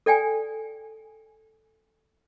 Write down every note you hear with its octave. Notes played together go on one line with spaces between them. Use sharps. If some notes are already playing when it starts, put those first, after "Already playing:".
A4 D5 G5 G#5